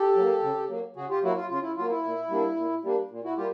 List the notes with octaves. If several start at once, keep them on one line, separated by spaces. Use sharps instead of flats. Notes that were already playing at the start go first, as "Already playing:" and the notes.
Already playing: G4 A4
F#3 A#3
C#3
F#3 A#3
C#3 F#4 G#4
F4 G4
F#3 A#3 E4 F#4
F4
C#3 F4
E4
F#3 A#3 F4
E4
A#2
G3 A#3 D4
A#2
G3 A#3 D4
A#2
E4 F#4
G3 A#3 F4 G4